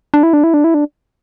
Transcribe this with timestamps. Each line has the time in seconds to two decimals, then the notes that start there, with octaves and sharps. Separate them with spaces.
0.14 D4
0.23 E4
0.33 D4
0.44 E4
0.54 D4
0.64 E4
0.74 D4